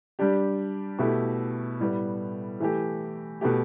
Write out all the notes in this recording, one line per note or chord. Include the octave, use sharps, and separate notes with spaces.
G3 D4 G4
B2 A3 E4 G4
A2 G3 B3
E3 A3 G4
B2 A3 G4